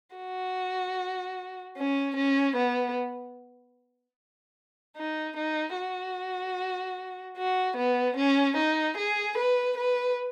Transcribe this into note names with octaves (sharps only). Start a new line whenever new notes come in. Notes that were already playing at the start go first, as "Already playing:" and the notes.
F#4
C#4
C#4
B3
D#4
D#4
F#4
F#4
B3
C#4
D#4
G#4
B4
B4